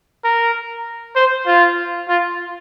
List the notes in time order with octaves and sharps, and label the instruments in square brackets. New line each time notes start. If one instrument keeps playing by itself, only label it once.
[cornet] A#4
C5
F4
F4